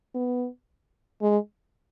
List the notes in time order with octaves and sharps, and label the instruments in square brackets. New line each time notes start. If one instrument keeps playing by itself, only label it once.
[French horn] B3
G#3